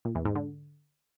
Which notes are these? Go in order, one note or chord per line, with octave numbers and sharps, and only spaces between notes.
A#2
E2
G#2
D3